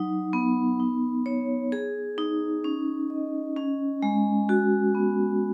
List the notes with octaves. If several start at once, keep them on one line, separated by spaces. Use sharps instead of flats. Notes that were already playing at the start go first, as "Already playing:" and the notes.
Already playing: F#3 D#4
B3
D#4
C#5
G#4
D#4
C#4
D#5
C#4
G#3
F#4
B3